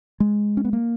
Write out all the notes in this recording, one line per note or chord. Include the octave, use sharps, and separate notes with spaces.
G#3
C#4
B3
A#3